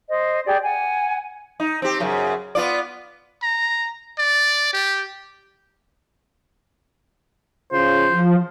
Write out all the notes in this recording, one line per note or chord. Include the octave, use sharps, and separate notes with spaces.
C5 D#5
G4 G#4 D5
F#5 G#5
D#4
C4 G4
F#2 C#3
B3 F4 D5
A#5
D5
G4
C#3 F4 C5
F3 F4